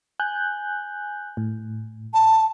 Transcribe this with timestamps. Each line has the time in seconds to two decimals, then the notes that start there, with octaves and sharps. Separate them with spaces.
0.20 G#5 F#6 G6
1.37 A2
2.14 A5